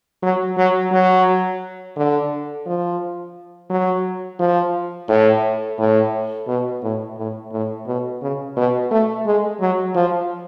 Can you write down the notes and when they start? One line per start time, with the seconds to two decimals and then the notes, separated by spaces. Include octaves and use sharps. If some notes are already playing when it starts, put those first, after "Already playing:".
0.22 F#3
0.57 F#3
0.92 F#3
1.96 D3
2.66 F3
3.70 F#3
4.39 F3
5.09 A2
5.78 A2
6.48 B2
6.83 A2
7.18 A2
7.52 A2
7.87 B2
8.22 C#3
8.57 B2
8.91 A3
9.26 G#3
9.61 F#3
9.95 F3